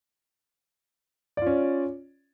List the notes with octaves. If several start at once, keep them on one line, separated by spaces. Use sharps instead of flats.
C#4 F4 D5